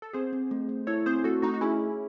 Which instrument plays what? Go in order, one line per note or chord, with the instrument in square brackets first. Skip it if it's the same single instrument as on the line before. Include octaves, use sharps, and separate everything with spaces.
[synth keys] A4
[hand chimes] C4 [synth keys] G#4 C5
[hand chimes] C4
A3
A3
[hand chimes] E4 [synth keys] A4 C#5
[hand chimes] C4 [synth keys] G#4 C5
[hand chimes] A3 [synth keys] F#4 A4
[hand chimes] A3 [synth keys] D#4 F#4
[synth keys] F#4
[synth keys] C#4 E4 [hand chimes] G#4
[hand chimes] G#4